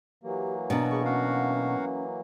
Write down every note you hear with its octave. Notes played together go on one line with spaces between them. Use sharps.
E3 F#3 A#3 G4
B2 B3 D4 A#5
B3 G#4 C#6
C#4 F#4 F5 F#5